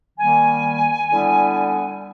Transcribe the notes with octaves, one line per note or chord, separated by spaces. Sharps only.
D#3 G3 A#3 G#5
D3 G3 B3 E4